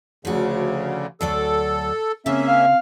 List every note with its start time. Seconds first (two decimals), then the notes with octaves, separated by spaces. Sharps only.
0.25 D2 C#3 F3 F#4
1.21 D2 F#3 A4 D5
2.26 C#3 A#3 C4 C#4 E5
2.47 F5